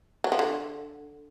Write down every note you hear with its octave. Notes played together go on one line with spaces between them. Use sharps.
F#3
F3
D3